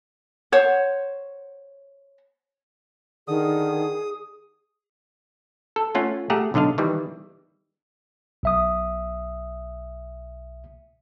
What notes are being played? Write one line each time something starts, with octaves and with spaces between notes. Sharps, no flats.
C5 C#5 F#5
D3 D#3 G#4 D#6
A4
A3 C#4 F4 F#5
A3 G4 G#4 F#5 A#5
B1 D3 D4 D#5 F5
D#3 E3 G3
B1 E5 D#6